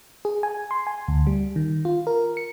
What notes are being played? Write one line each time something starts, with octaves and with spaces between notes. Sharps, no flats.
G#4
G#5
C6
G#5
D2
G3
D#3
F4
A#4
C#7